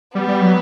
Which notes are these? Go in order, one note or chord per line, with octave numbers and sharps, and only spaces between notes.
G3 B3
G3
F#3